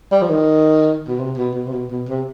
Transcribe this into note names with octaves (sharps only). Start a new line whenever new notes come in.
G3
F3
D#3
B2
C3
B2
B2
C3
B2
B2
C3